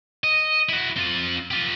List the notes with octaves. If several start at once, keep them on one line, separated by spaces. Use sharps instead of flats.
D#5
E4 F#4
C4 F4
F4 G4